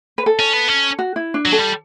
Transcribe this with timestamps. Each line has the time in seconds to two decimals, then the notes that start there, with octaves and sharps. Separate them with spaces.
0.18 B4
0.26 A4
0.40 C#4
0.54 B3
0.68 C#4
0.99 F#4
1.16 E4
1.34 D4
1.46 F#3
1.52 A4
1.59 G3